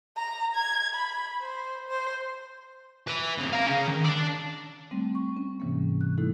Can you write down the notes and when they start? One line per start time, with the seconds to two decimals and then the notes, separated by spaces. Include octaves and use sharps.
0.17 A#5
0.55 G#6
0.94 B5
1.41 C5
1.89 C5
3.08 B4 E5
3.38 C#3 C4
3.53 F5 A#5
3.66 C#3 C#4
3.88 D#3
4.04 D4 D5
4.91 G3 A3 C4
5.15 C#6
5.36 C#4
5.60 G#2 C3 E3 G3 A#3
6.01 F#6
6.18 G#3 A3 D#4 E4 A4